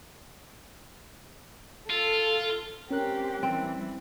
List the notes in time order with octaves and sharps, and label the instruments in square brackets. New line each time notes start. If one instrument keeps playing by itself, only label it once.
[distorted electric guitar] F4 [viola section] A4
[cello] C4 G4 [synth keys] C#4 A#4 F#6
[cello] E3 G3 [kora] C4